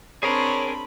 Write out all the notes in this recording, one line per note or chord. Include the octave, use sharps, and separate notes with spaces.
C4 D4 G#4 A#4 C#5 B5